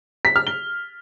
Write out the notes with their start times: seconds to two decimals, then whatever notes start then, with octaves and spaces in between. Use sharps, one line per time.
0.25 B6
0.36 F6
0.47 G7